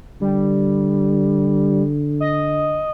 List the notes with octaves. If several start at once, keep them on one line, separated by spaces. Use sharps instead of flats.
D3 G3
D#5